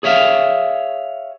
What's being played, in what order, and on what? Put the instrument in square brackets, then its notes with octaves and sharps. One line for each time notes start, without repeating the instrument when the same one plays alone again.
[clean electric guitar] G#4 C#5 E5 F5